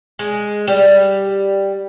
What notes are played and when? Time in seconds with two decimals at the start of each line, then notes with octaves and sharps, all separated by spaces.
0.19 G#3
0.68 G3